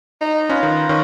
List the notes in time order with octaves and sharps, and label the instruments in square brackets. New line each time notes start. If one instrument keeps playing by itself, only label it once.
[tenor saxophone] D#4
[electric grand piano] C#4 [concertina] F4 B4 A#5
[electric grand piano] D#3
[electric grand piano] D#3 [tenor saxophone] C#4